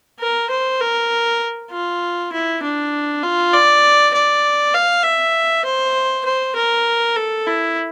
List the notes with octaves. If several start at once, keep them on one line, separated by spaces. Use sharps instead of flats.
A#4
C5
A#4
F4
E4
D4
F4
D5
D5
F5
E5
C5
C5
A#4
A4
E4